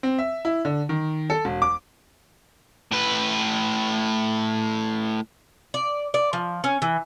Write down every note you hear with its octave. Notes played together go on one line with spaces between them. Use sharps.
C4
E5
E4
D3
D#3
A4
E1
D6
A2 B4
D5
D5
F3
C#4
E3